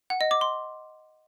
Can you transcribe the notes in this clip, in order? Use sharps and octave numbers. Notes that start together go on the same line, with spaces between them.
F#5
D#5
D6
C6